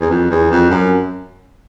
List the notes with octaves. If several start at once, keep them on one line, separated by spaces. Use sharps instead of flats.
E2
F2
E2
F2
F#2